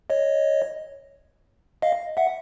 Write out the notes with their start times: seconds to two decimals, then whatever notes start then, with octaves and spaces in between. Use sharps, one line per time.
0.10 C#5 D#5
1.82 D#5 F5
2.17 E5 F#5